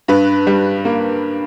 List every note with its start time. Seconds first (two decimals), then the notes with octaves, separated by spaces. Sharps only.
0.08 G2 B4
0.47 G3
0.85 A#3